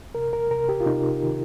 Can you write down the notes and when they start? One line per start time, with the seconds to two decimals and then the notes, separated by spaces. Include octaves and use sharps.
0.15 C3 A#4
0.33 A#4
0.50 C3 A#4
0.69 G4
0.80 F4
0.86 C3 D#4
1.22 D#3